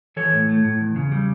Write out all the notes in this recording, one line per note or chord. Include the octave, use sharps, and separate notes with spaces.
E3 A4 C#5
A2
A3
A2
E2
C#3
G3